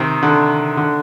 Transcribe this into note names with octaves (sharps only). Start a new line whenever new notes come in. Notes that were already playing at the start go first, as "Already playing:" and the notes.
Already playing: C3 D#3
D3
D3